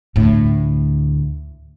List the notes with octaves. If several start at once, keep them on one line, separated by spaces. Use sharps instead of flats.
D2 A2